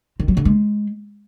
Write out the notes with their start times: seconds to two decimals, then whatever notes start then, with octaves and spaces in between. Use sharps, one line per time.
0.20 D#3
0.28 F#3
0.37 D3
0.45 G#3